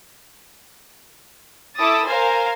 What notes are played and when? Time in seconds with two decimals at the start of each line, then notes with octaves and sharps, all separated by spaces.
1.77 E4 A4 D6 D#6 A6
2.06 A#4 C5 F5 G#5